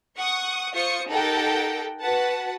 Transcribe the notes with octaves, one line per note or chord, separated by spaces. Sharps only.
F#5 C#6 D#6
F4 C5 C#6 D#6 C#7
D#4 G4 A4 A#4 F#5 G5
F#4 B4 F#5 A5